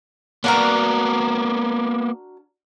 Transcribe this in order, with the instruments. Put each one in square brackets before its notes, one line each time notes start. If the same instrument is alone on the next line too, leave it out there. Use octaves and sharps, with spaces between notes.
[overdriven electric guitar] A#3 B3 [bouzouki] D4 F#4 A#4